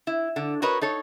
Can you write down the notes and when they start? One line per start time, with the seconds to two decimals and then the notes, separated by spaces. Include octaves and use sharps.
0.07 E4
0.36 D3
0.62 F#4 A#4 B4 C#5 D#5
0.81 D#4 A4 C#5